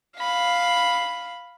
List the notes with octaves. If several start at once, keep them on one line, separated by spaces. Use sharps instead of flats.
F5 B5